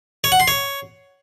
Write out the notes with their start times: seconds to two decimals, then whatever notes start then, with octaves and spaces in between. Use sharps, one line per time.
0.24 C#5
0.32 F#5
0.40 C6
0.48 C#5